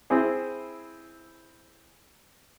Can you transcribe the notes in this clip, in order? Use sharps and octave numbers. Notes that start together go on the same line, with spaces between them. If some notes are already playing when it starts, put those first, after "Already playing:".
C4 E4 G#4 C5